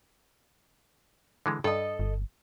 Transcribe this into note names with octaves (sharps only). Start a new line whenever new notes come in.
D3 E3 G#3
G2 A4 D#5
G1